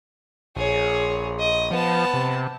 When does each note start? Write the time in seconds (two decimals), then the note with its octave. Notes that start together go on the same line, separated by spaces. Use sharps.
0.56 A#1 G#4 C#5
1.39 D#5
1.71 F3 B3 A5
2.14 C3